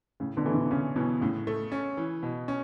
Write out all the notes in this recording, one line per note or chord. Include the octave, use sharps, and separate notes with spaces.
A2 C#3
B2 D3
E3 A3
B2 D3
C#3 C#4
B2 E3
A2 C#3
A3
C#4
E3
B2
C#4